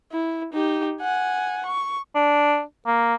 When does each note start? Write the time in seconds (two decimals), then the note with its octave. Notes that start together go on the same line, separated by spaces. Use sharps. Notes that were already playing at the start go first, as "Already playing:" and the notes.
0.12 E4
0.53 D#4 G4
1.02 F#5 G#5
1.66 C#6
2.15 D4
2.86 A#3